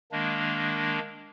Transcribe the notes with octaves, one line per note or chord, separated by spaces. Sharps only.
D#3 G#3 A#3 D4